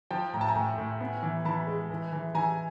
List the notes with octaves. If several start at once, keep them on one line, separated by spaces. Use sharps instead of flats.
F3 G5 A5
A2 A#5
A5
G#5 A#5
A2
A2
B3
E3
E3 A5 B5
G#3
E3
E3
E3 G#5 A#5